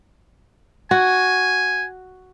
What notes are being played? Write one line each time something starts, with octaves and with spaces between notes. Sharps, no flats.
F#4 G#5